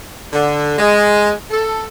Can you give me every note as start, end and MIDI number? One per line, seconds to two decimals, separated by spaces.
0.33 0.76 50
0.79 1.31 56
1.51 1.85 69